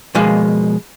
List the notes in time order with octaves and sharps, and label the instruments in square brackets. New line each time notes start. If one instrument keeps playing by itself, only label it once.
[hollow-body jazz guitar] B2 F3 G#3 A#3 F5